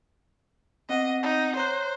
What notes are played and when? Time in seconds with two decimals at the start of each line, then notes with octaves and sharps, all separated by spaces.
0.89 B3 C4 D#5 F#5
1.22 D#4
1.56 C5 C#5 A#5 F#6